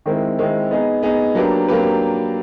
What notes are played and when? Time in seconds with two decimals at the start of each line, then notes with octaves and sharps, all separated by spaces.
0.06 D#3 G#3 C4 E4
0.39 D#3 G#3 C4 E4
0.71 B3 D#4 G#4
1.03 B3 D#4 G#4
1.35 F#3 A#3 D4 G4 B4
1.68 F#3 A#3 D4 G4 B4